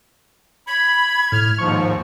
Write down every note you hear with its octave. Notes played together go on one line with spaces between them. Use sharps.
B5 G#6
A2 F6
D#2 G#2 F3 C#6